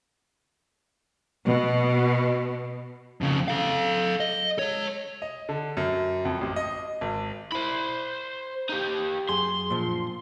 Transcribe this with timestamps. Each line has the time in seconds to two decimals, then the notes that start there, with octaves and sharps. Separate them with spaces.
1.45 B2
3.21 F2 C#3
3.48 A4 F5
4.20 D#5
4.59 G#3 C#5
5.22 D#5
5.49 D3
5.77 F#2
6.25 F2
6.41 A1
6.56 D#5
7.01 G#1
7.52 E4 C5 B5
8.70 D#4 G4
9.29 F#2 G#4 C6
9.70 A#2 F3